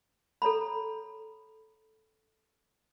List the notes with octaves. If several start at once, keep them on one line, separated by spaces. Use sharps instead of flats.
A4 C#5 A#5 B5